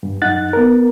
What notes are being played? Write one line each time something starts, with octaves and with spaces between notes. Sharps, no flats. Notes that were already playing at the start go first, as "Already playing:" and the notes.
G2
F#2 D#4 F#5 F#6 A6
B3 A#4